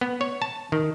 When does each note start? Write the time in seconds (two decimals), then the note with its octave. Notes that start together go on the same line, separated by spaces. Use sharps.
0.01 B3
0.21 C#5
0.42 A5
0.72 D#3